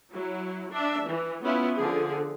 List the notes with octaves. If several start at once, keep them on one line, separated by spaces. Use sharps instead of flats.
F#3 E4
D4 E5
E3
B3 C#4 E4 F4
D3 F3 G#4